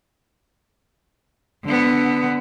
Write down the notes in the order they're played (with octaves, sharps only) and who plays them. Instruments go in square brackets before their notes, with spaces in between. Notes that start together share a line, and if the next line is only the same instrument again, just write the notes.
[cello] D3 B3